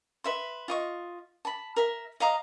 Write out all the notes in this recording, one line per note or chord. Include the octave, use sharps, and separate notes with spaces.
B4 E5 C6
F4 D#5 C#6
A5 B5
A#4 E5
D#5 F5 A#5 D#6